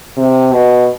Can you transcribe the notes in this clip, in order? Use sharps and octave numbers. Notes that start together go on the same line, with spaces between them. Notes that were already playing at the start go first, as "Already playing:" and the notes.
C3
B2